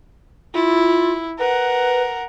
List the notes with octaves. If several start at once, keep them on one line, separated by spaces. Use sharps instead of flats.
E4 F4
A#4 B4 F#5